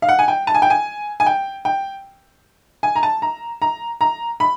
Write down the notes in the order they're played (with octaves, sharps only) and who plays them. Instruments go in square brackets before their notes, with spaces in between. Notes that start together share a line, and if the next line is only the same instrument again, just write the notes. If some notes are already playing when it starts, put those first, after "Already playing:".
[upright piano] F5
F#5
G#5
G5
A5
G#5
G5
G#5
G#5
G5
G5
G#5
A#5
A5
A#5
A#5
A#5
B5